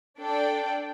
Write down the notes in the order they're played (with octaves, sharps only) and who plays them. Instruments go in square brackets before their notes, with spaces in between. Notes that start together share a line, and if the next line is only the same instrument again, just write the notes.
[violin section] D4 A4 D5 G5